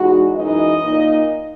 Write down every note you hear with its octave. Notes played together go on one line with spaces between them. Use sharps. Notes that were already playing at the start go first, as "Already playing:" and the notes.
Already playing: E2 B2 G#3 D#4 F#4
F#2 E3 G#3 D#4 D#5
A#2 A#3 D#4